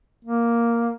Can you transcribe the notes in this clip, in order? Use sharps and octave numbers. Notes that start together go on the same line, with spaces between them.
A#3